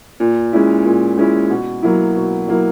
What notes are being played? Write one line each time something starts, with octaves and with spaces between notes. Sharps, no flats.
A#2
G#3 C#4 E4
A#2
G#3 C#4 E4
B2
F#3 A#3 E4
B2
F#3 A#3 E4